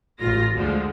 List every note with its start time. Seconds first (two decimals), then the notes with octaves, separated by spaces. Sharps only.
0.19 A1 F4 A#6
0.54 D2 D3 F3 G#3